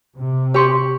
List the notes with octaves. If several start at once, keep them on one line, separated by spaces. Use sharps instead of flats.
C3
G4 C5 C6 C#6